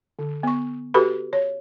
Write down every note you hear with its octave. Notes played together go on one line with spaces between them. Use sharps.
D3
B3 C#6
F#4 G4 A4 B4 B5
C#5